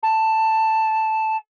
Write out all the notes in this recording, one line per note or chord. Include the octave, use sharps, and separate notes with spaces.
A5